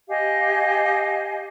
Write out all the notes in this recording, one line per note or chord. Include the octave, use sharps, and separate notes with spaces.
G4 D#5 F5 G#5